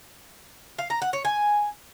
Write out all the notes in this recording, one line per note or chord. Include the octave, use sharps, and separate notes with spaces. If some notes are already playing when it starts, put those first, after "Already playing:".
F5
A#5
F#5
C#5
G#5